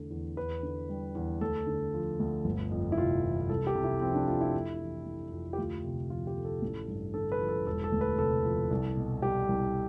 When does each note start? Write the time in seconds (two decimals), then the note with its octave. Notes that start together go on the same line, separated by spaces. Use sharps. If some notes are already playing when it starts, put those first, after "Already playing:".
Already playing: E2 D3 A3
0.11 E2
0.37 E2 B4
0.63 D3
0.89 G3
1.15 E2
1.41 D2 A4
1.67 D3
1.94 F3
2.20 D2
2.45 G1
2.71 F2
2.92 E4
2.98 C3 F4
3.23 E3
3.49 C2 A4
3.67 G4
3.75 C3
3.84 E4
4.01 F3 C4
4.14 D4
4.28 A3 F4
4.41 E4
4.54 F2
4.80 E3
5.06 A3
5.32 F2
5.53 G4
5.58 D2 F4
5.84 C3
6.10 F3 F4
6.27 G4
6.36 A3
6.45 A4
6.62 A1
6.88 G2
7.14 D3 A4
7.32 B4
7.41 F3
7.49 A4
7.67 E1 A4
7.84 A4
7.92 D2
8.01 B4
8.19 C3 A4
8.44 F3
8.71 C2
8.97 B2
9.22 G3 G4
9.49 C2